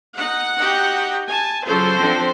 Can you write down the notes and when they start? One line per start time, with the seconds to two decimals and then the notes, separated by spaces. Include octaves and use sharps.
0.17 D#4 F#5
0.57 D#4 F#4 G4
1.29 G#5 A5
1.65 C#3 F#3 F4 A4 C5
1.95 D3 F3 C4